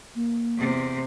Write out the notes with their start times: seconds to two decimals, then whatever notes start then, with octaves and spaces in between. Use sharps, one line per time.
0.15 A#3
0.57 E2 C3